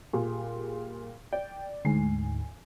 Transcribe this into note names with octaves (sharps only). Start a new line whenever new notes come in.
A#2 G3 G#4
D5 G5
D2 G#2 G#5 C7